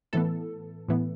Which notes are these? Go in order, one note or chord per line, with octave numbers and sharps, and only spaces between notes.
A2 E3 B3 A4
A2 E3 B3